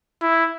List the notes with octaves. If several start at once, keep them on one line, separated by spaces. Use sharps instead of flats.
E4